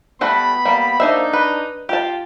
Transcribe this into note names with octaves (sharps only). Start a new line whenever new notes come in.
G3 A3 B3 F#4 B5
G3 A#3
A#3 D4 D#4 C5 E5
B4
F4 G4 A5